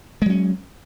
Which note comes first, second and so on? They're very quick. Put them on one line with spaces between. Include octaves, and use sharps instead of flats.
G#3 F#3 C#4